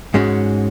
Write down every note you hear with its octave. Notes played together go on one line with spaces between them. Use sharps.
G#2 G#3 C#4 F#4